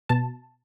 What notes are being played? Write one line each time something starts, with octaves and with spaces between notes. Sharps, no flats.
B2 A5